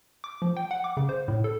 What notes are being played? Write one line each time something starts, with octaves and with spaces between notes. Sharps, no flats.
D6
F3
G5
F#5
D6
C#3
C5
A2
A4